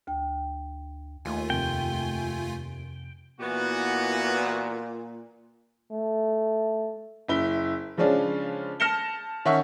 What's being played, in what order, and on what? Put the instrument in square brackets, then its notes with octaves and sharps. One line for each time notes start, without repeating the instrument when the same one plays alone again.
[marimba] D2 G5
[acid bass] D#2 [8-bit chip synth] A3 F4 G#5
[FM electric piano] F2 C3 [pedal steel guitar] G5
[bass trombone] A#2 [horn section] E3 B3 F#4
[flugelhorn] A3
[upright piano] F#1 E4 G7
C#3 F3 G#3 C#4 D4 F4
A5 F6 A#6 C#7 E7 G7
D#3 C#4 E5 F#5 C#6